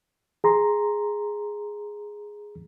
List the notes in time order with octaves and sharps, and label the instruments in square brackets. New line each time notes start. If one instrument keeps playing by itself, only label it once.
[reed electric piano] G#4 A#5 C6